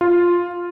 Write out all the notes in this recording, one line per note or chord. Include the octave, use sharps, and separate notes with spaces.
F4